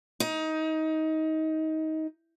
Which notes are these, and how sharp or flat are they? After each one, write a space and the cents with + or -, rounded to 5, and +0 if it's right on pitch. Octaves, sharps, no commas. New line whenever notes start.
D#4 +20